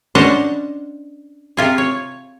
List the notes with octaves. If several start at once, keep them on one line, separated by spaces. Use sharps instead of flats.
C#4 D4 C5 C#5 D#5 F#5
C3 F4 G#4
C#5